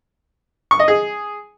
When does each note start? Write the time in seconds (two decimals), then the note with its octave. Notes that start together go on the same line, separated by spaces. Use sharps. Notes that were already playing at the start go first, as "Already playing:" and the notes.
0.71 C#6
0.79 D#5
0.88 G#4